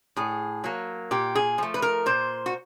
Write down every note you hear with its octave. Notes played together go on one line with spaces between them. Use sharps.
A2 G#4
F#3 A#3
A#2 G4
G#4
F3 A3
B4
A#4
A#2 C5
F#4